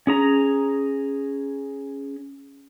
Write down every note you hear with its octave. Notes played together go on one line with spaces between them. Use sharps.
C#4 G#4 A#5